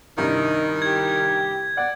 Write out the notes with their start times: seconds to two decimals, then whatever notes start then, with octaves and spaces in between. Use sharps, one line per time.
0.18 C2 G2 D#3 D#4
0.82 G4 G#6
1.77 D5 F#5